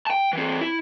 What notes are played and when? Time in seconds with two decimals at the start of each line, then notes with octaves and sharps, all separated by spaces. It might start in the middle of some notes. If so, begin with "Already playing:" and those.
0.07 G5 A5
0.33 E3 C4
0.61 E4